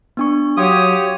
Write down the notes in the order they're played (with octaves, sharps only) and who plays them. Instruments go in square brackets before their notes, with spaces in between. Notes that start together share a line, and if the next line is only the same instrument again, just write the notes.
[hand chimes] B3 D4 C#6
[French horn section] F#3 [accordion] G4 C#5 [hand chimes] F5 C6 D6 [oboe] D#6